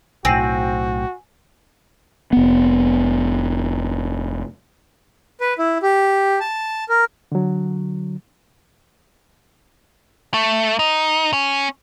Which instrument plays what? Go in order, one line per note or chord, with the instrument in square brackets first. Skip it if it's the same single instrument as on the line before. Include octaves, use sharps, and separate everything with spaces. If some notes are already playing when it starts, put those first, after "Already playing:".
[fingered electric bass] B1 A2 [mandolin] C4 [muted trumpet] F#4 [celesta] G#5 C7 D#7
[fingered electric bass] F1 B3
[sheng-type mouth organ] B4
E4
G4
A5
A#4
[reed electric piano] D3 F#3
[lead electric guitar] A3
D#4
C#4